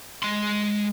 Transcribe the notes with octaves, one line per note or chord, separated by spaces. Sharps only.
G#3 C6